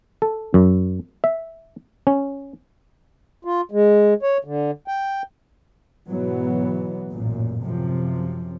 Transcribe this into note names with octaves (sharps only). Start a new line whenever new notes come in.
A4
F#2
E5
C#4
F4
G#3
C#5
D3
G5
G#2 B2 E3 F#3 B3
A1 F#2 A#2
F#2 C3 F3